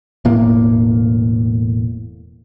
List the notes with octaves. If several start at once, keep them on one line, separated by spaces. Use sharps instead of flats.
E1 A2 A#3